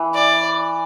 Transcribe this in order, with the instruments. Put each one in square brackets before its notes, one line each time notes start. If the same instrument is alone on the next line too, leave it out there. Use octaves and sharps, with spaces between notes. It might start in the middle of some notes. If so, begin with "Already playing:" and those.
Already playing: [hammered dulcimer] E3
[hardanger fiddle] D5